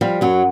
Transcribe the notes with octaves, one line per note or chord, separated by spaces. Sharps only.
F3 G3
F#2 F#3